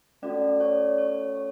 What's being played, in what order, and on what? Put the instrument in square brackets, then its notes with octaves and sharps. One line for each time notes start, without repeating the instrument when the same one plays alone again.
[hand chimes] A3 C#4 F#4 A4 D5
D5
C#5
C#5
C#5